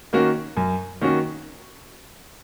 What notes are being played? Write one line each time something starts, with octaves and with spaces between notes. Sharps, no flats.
D#3 A#3 C#4 F#4
F#2
D#3 A#3 C#4 F#4